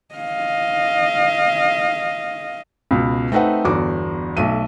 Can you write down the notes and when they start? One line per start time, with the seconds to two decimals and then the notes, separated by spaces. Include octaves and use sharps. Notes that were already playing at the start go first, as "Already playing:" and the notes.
0.15 D#5 F5
2.91 C#2 B2
3.32 A3 C4 D#4 B4 F#5
3.65 G1 E2 F#4 D6
4.37 B1 A3 D#7